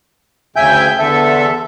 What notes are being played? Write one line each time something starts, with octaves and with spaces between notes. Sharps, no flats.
D2 C#3 E5 G5 G#5 G6
E2 D3 A4 E5